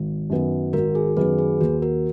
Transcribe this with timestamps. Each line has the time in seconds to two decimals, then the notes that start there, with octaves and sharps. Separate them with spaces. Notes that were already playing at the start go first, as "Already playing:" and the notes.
Already playing: G#1
0.30 F#2 D#3 F#3 B3
0.73 G#1 F#4 A#4
0.95 G#4
1.17 F#2 D#3 F#3 B3 G#4 B4
1.38 G#4 B4
1.61 D#2 F#4
1.82 F#4 A#4